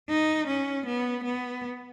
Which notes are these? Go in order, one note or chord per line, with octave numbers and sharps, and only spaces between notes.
D#4
C#4
B3
B3